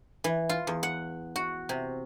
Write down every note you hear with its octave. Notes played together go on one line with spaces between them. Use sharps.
E3
F4
E2
F#5
F#4
C3